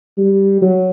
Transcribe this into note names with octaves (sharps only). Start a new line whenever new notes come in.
G3
F#3